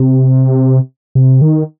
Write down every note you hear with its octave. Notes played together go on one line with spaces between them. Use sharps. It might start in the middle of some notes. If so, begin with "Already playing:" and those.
Already playing: C3
C3
D#3